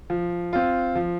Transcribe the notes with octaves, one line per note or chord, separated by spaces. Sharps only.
F3
C4 F4
F3